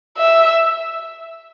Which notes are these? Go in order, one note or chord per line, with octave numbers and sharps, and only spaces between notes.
E5